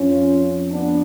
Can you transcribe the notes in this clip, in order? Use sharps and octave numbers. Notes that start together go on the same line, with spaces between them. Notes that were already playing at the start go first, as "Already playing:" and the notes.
Already playing: F2 F3 C#4 F4
B3 D4